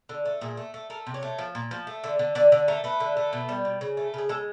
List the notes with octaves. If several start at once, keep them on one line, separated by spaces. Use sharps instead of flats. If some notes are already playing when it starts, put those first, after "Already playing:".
D3
A3
A#2 G#4
A3
A3
A3 A#4
C3
C#5
A3
F3
A#2
F3
A3
D3
D3
D3 D5
D3 D5
A3 A#4
A3 B4
D3
A3
B2
G3
B2
C#3
A3
C#3 G#4
G#3 A4